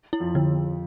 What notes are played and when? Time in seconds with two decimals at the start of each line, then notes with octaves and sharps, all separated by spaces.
0.13 E4
0.20 F2 F3
0.35 D3